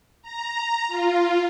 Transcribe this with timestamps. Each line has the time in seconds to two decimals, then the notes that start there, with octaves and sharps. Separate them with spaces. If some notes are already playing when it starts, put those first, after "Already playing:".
0.22 A#5
0.88 F4